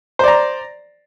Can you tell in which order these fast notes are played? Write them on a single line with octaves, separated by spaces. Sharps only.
C5 D5 A#5